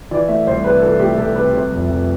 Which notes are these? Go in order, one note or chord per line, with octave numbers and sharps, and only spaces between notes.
E3 D5
A3 E5
C2 C5
C3 B4
E3 A4
A3 G4
C2 A4
C3 B4
C3
F1
F1